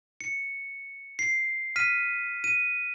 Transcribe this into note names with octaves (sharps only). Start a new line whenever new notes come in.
C#7
C7
F6 B6 D#7
D#7